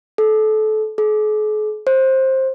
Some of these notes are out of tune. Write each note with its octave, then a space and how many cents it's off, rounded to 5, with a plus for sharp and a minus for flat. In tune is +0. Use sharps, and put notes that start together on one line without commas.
A4 -25
G#4 +45
C5 +15